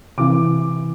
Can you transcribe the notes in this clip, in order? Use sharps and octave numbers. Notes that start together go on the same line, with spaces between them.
C3 E3 D6